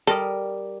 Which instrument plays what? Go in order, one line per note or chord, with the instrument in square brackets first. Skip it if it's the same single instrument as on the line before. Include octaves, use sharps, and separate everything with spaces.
[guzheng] G3 A#4 D#5 [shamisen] A4